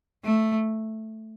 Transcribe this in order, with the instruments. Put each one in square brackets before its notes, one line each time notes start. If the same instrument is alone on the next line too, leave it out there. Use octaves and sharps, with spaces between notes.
[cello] A3